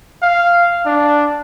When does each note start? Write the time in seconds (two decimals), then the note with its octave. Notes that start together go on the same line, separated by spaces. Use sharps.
0.23 F5
0.86 D4